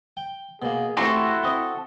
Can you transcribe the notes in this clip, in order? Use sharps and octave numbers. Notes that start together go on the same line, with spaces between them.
G5
B2 A#3 G#4
A3 C4 E4 F#4 G4 A4 C6
C4 D#5